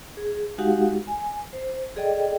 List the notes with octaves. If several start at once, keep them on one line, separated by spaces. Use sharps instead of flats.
G#4
G#3 D#4 F#4 G4 F5 F#5
G#5
C5
G#4 A4 D5 D#5 G5